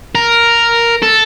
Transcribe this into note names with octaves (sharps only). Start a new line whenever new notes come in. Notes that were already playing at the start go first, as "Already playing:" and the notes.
A#4
A4